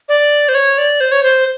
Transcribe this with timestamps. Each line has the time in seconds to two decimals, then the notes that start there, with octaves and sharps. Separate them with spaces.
0.09 D5
0.49 C5
0.55 C#5
0.78 D5
1.00 C5
1.12 C#5
1.23 C5